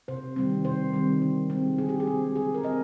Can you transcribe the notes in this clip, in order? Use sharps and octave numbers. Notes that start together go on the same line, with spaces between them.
C3 C5
D#3 G3 C4
C3 C5
D#3 G3 C4
D3
G#3 C4
D3 G#4
G4
G#4
G#3 C4
D3 G#4
A#4
G#3 C4 D#5